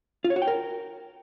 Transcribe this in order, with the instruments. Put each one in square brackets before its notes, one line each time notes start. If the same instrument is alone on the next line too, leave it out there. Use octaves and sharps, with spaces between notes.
[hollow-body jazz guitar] F4
C#5
F#4
G5
A#4